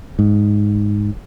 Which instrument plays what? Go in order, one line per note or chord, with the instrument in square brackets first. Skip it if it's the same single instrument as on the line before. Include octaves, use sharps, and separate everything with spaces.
[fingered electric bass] G#2